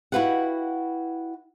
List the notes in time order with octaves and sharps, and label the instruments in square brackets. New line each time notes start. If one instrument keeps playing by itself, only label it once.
[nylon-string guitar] E4 F#4 G4 B4 F5 F#5